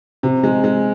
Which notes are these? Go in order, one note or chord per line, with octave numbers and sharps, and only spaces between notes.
C3
G#3
G#3